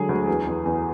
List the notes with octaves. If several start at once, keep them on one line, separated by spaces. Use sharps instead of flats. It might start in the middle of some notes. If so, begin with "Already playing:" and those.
Already playing: D3 F#3 G#3 G#4
D2
E2
E2
E2